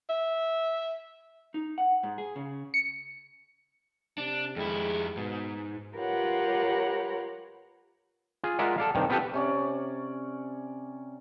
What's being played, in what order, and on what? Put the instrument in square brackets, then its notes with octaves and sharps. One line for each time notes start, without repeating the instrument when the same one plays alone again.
[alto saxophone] E5
[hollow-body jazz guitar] D#4
F#5
G#2
G#4
C#3
[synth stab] C#7
[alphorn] C3 [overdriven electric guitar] D4
[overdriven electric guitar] F2 E4 [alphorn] G#3
[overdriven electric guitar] G#2 [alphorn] B2
[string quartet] F4 G4 A#4 B4 C#5 F#5
[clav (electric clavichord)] F4 G#4
G#3 F4 A#4 D5 E5 F#5
A4 D5 F5
G2 C3 D#3
B3 C4 F4 G4 A4 B4
[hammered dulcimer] C3 C#4 D5